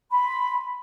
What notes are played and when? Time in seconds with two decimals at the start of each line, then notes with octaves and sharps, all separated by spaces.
0.12 B5 C6